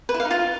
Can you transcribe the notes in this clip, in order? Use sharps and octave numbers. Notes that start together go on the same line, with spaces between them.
B4
E4
F5
D#4
F4